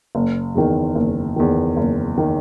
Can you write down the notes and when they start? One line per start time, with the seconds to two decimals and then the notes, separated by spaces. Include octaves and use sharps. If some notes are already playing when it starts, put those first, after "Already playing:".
0.15 F#1
0.55 E2 D#3
0.95 F#1
1.36 E2 D#3
1.77 F#1
2.18 D#3